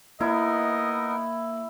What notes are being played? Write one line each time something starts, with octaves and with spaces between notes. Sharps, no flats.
A#3 B3 D#4 E4 A#4 D#5